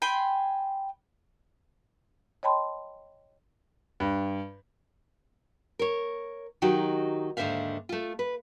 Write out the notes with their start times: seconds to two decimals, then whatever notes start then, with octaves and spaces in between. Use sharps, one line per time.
0.02 G5 G#5 B5 C6
2.43 C#5 D#5 G5 A5 B5 C6
4.00 G2
5.79 A#4 C#5
6.62 D#3 F#3 D#4 F#4 G4
7.37 D#2 G#2 D3 C5 E5 F5
7.89 A3 F4
8.19 B4